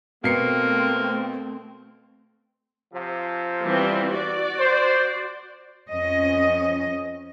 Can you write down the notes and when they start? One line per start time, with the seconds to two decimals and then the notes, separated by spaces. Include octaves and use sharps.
0.24 B2 A3 A#3 C4 C7 C#7
2.94 C3 F3
3.63 E3 G3 C4
4.13 F#4 D5
4.59 C5
5.88 F2 C#4 D#5